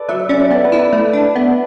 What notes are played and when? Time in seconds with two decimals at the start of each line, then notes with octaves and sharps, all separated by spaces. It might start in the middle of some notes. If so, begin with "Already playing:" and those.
Already playing: A4 B4 D5
0.09 F#3 E5
0.20 E5
0.29 C#4 D5
0.40 D5
0.50 B3 D5
0.65 B4
0.72 E4
0.79 B4
0.93 A3
1.13 D4
1.36 B3